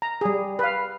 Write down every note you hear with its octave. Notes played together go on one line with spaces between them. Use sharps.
A#5
G3 G#4
B4 F5